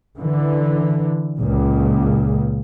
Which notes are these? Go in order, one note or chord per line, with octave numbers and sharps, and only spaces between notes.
D3 E3
C#2 A#2